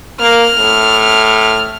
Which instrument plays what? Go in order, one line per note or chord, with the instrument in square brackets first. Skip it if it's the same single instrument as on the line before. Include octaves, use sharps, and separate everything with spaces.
[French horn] A#3 [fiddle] F6
[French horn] A2